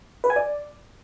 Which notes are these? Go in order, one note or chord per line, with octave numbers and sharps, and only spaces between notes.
B4
G#5
D5